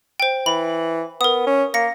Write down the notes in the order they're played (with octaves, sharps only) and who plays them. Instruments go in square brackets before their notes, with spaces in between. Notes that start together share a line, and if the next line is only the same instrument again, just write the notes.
[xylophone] C5 G5
[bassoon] E3 [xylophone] B5
[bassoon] B3 [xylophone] A#4 D#6
[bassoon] C#4
[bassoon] A#3 [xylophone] A#6 C#7